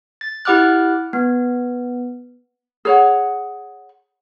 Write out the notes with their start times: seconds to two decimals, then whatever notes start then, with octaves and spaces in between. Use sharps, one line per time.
0.21 A6
0.45 E4 G4 F#5 D6 F6 F#6
1.13 B3
2.85 G#4 C#5 F#5